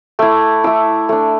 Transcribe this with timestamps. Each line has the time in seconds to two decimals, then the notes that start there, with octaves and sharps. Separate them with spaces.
0.19 A3 E4 D6
0.64 A3 E4 D6
1.09 A3 D4